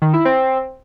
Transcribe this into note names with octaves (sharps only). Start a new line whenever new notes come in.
D#3
E4
C4